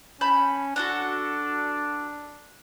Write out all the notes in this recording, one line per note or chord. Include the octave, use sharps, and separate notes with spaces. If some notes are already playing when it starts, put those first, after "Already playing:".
C#4 A5 B5 G6
D4 F#4 A4 F#5